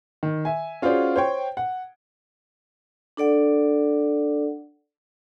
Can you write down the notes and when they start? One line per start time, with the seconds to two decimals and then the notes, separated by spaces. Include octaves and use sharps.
0.23 D#3
0.45 E5 G#5
0.82 C#4 F4 F#4 G#4 C5 D5
1.16 C5 C#5 G5
1.57 F#5
3.17 D4 A4 D5 F#5